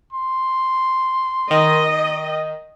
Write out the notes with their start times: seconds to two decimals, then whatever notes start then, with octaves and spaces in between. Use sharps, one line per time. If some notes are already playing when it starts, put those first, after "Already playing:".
0.13 C6
1.51 D#3 D#5